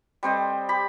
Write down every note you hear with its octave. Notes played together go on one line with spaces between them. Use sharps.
G3 C4 C5 D#5
G4 B5